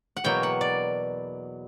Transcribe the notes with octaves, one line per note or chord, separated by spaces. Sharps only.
F#5
E2 B2 F#3 A#3 G5
F#5
D5